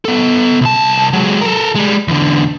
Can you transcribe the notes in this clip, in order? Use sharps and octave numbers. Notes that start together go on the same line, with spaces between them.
B3 A4
C2 A5
F#3 G#3
A4 A#4
G3 G#3
E2 D3